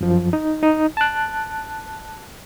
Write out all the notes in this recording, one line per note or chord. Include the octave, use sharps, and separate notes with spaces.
F#2 F3
D#4
D#4
A5 F#6